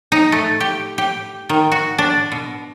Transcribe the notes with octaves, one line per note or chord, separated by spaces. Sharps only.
D#4
A3
G4
G4
D#3
F#4
D4
B2